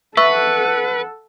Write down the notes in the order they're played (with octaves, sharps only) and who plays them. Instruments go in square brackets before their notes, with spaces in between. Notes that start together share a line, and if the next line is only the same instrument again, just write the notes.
[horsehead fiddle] A4 F#5 [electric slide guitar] B4 [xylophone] E5 C#6 E6